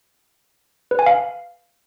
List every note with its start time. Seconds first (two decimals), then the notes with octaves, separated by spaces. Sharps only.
0.91 B4
0.99 G#5
1.06 F5